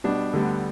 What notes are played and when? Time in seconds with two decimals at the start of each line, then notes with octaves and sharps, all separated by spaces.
0.04 B2 G3 B3 D4
0.33 D2 D3 G3 B3